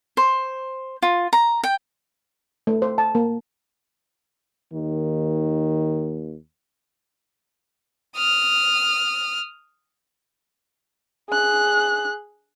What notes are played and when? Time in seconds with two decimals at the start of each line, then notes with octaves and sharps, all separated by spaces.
0.17 C5
1.02 F4
1.33 A#5
1.64 G5
2.67 A3
2.82 C5
2.98 A5
3.15 A#3
4.73 D#2 D#3
8.16 D#6 F6
11.29 G#4 F#6